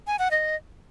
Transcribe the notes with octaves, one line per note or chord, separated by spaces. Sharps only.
G#5
F#5
D#5